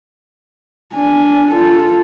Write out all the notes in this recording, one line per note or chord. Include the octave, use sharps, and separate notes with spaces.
D4 G#5
F4 A4